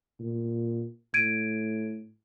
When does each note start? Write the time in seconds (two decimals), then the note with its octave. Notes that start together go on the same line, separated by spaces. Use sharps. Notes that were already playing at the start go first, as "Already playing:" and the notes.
0.20 A#2
1.14 A2 G#6 D7 D#7